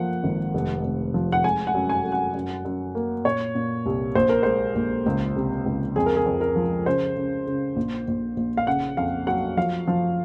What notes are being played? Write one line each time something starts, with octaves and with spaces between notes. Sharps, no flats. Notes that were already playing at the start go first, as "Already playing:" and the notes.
Already playing: F3 A#3 F#5
G#1
F1
F1
F3
F#5
G#3 G#5
F#5
F#2
G#5
F#2
F#5
F#2
F#2
A#3
A#2 C#5
A#2
C2
A#1 C5
A#4
G#3 C5
A#1
C#2
C3
C#2
F2 G#4
A#4
G#4
F2
A#4
F3
C#3 C5
C#3
C#3
A#1
A#1
A#1
F5
C#3 F#5
F2 F5
F#3 F#5
F3 F5
F3